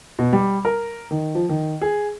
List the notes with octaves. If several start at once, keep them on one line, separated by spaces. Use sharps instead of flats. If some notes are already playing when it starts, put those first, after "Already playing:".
B2
G3
A#4
D#3
F3
D#3
G#4